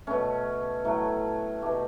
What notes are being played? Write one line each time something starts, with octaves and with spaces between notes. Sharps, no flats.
B2 A3 C#4
A2 F#3 A3
B2 A3 G4